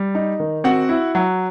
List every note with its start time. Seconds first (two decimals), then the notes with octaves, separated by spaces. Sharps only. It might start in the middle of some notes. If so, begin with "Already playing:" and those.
Already playing: G3
0.15 D#4
0.40 D#3
0.64 C4 F#4 F#5
0.89 E4
1.15 F#3